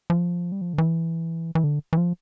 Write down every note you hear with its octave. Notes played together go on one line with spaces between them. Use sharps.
F3
G3
F3
D3
E3
E3
D3
E3
F3